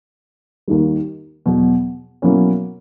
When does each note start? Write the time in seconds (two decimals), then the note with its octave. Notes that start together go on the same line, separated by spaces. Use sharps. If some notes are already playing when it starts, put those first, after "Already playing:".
0.68 D#2 D#3 G3
1.46 E2 B2 F#3
2.22 B2 F#3 A#3 C#4 E4